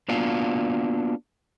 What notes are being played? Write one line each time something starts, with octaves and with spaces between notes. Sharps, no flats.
A#3 B3 D4 F4 F#4 F5